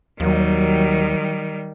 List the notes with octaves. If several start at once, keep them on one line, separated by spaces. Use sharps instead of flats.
D#2 D#3 F#3 G3